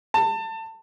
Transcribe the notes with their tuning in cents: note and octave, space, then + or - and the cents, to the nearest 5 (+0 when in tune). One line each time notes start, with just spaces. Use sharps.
A5 +25